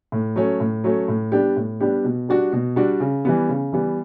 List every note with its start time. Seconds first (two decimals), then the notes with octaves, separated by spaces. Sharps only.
0.12 A2
0.36 F#3 A3 C#4
0.60 A2
0.84 F#3 A3 C#4
1.08 A2
1.32 G3 B3 D4 G4
1.57 A2
1.80 G3 B3 D4 G4
2.05 B2
2.29 G3 D4 F#4
2.52 B2
2.76 G3 D4 F#4
3.00 C#3
3.25 E3 G3 B3
3.49 C#3
3.73 E3 G3 B3